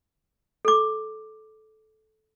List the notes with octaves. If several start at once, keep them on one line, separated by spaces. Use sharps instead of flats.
A4 D6